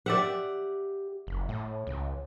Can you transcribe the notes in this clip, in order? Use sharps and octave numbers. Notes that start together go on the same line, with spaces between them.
G4 D5 E5 F#5
F#1
A2
C#2